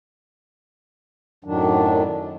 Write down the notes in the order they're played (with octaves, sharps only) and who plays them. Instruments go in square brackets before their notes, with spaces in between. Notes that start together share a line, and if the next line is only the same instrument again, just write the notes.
[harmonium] F#2 A2 D#3 F#3 D4